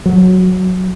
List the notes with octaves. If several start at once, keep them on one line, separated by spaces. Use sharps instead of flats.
F#3